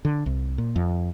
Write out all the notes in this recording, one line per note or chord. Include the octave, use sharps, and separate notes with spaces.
D3
C2
A#2
F2